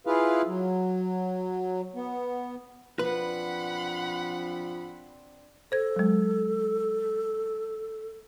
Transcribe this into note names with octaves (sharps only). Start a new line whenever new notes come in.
E4 F4 G#4 B4 F5
F#3
B3
F3 C4 D4 B4 F#5 B5
A4 C5 G#6
F#3 G#3